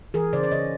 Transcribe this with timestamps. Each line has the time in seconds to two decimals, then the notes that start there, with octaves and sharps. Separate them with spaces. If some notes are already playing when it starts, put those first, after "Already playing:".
0.14 E3 G#4 A#4
0.33 C#3 C5 D5
0.43 D5
0.51 C#3 C#5 D#5